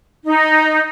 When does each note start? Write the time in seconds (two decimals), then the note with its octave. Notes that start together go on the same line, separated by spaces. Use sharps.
0.24 D#4